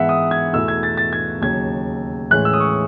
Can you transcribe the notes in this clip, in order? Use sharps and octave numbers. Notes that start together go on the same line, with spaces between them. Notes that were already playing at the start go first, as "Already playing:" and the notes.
Already playing: G#2 E3 B3 E5 F#5
D#6
G#6
E2 B2 A3 E4 E6
G#6
A6
A6
G#6
D#2 C#3 F#3 G#6
A2 E3 G#3 C#4 F#6
E6
D#6
C#6